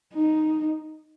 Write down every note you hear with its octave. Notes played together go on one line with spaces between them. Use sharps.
D#4